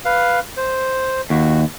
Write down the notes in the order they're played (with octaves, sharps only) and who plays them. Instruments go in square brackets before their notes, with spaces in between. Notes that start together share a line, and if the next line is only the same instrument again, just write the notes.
[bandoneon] B4 F5
C5
[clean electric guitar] D#2 [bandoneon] F#4